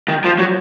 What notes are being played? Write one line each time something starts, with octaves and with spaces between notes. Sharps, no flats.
D#3
F3
F#3